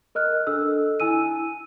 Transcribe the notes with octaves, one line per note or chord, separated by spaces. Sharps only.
A#4 D#5 F6 F#6
D4 A4 E6
E4 G#5 E6 D#7